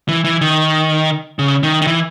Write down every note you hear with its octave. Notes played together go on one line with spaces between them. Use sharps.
E3
E3
D#3
C#3
D#3
D#3
E3